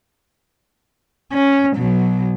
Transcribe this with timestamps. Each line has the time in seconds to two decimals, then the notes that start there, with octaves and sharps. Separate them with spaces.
1.33 C#4
1.76 B2 F#3